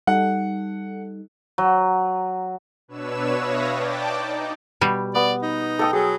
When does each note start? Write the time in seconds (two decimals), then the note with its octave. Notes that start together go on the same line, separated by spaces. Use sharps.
0.07 G3 D#4 A4 F#5
1.58 F#3
2.88 B2 D4 B4 C#5 E6 E7
3.37 B4 C#5 E5 F5 D#6 A#6
3.69 D5 G5 A5 D6
4.15 D#4
4.81 B2 G3
5.15 B3 D5
5.43 D#4
5.79 A4 G5 D#6
5.93 F#3 G#4